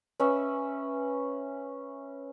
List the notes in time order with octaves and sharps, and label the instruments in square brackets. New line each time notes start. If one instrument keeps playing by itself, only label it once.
[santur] C#4 B4 E5